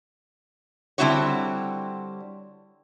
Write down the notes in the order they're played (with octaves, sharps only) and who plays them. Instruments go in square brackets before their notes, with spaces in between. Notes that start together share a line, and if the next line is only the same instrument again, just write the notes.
[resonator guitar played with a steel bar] D3 G3 C4 E4 F#4 C#5